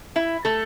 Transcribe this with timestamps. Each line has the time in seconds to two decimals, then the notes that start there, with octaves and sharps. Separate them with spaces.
0.16 E4 E5
0.45 A3 A4